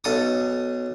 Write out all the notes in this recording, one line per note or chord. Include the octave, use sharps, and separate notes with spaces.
B1 A4 D#6